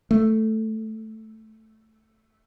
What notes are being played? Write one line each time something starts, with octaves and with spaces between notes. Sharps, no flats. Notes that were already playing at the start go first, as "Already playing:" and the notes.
A3